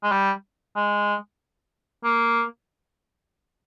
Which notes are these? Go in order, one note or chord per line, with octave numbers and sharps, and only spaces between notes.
G#3
G3
G#3
A#3